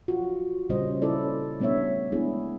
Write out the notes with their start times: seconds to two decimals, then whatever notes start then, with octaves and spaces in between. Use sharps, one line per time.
0.08 F4 F#4
0.69 A#2 C#3 G3 C#4 C5 D#5
1.02 C#4 E4 A4 D5
1.60 G3 A3 B3 D4 C#5 E5
2.12 G#3 A3 B3 D4 E4 G#4